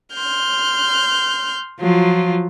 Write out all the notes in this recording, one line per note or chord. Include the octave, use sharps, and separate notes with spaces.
C6 F6 G6
F3 F#3 F4